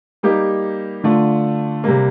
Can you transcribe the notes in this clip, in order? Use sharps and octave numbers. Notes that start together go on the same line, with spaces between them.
G3 A#3 D#4 G4
D3 A3 D4 F4
C3 G3 A#3